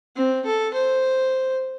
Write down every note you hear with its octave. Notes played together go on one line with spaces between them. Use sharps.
C4
A4
C5